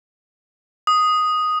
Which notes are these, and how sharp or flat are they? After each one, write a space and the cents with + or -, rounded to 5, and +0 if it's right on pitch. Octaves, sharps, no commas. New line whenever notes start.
D#6 +0